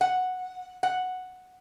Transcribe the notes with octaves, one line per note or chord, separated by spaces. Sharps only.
F#5
F#5